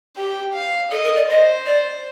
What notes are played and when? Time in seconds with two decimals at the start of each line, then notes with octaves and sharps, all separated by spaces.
0.17 G4 G5
0.55 F5
0.91 A4 D#5
1.04 A#4
1.16 D5
1.29 C5 D#5
1.66 D5